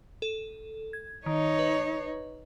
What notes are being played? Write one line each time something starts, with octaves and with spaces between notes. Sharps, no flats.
A4
G#6
D#3 D#4 C#5
B4